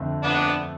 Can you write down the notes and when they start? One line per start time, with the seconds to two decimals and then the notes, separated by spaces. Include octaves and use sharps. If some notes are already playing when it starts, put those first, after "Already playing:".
Already playing: F2 D3 A3 C4
0.23 B3 D4